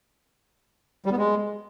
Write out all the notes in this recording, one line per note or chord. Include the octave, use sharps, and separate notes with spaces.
G3
B3
G#3